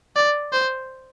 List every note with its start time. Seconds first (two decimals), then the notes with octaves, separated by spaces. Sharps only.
0.16 D5
0.52 C5